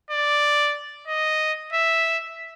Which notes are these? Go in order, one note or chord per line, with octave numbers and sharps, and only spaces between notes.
D5
D#5
E5